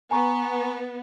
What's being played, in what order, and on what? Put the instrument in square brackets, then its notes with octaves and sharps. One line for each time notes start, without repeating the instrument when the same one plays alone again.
[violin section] B3 [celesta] G#5 A#5 C#6